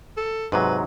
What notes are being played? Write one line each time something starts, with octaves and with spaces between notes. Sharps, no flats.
A4
G#2 C3 F#3 B4